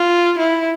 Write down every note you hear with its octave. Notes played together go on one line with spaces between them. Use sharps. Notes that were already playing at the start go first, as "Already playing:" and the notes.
Already playing: F4
E4